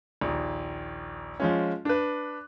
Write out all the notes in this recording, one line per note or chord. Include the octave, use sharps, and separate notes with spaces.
A#1 D#2
F3 G#3 C#4
D4 B4